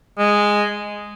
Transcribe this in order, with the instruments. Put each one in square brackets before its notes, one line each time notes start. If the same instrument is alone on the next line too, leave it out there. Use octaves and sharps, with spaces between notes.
[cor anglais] G#3